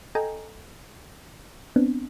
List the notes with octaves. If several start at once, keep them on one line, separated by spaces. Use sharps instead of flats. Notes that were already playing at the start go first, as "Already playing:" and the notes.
A4 D#5 G5 G#5 A#5
B3 C4 D4